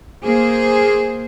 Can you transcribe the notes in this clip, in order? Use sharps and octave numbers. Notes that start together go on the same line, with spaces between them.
A#3 G#4 C5